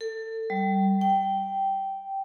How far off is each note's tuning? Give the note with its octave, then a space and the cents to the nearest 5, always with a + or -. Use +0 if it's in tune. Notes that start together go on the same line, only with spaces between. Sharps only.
A4 +25
G3 -20
G5 -10